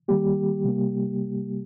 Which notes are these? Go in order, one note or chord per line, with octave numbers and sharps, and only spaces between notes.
D#3 G3 A#3 G4
C3 G3 A#3